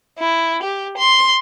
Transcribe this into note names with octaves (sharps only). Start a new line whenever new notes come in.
E4
G4
C6